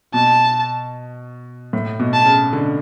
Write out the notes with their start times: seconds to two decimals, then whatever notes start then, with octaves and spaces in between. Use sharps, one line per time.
0.14 B2 A5
1.73 A2
2.00 B2
2.13 A5
2.26 C#3
2.53 D3